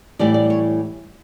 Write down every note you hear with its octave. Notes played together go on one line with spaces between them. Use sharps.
A2 E3 G3 D5
D5
C#5